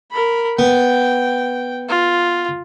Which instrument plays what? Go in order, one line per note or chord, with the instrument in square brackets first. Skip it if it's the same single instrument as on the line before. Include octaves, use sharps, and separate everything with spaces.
[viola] A#4 B5
[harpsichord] B3 [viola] G5
[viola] F4